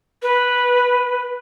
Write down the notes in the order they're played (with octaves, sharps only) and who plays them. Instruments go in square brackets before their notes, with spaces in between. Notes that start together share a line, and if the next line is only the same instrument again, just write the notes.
[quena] B4